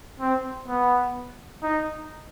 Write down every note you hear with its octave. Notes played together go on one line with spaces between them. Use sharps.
C4
B3
D#4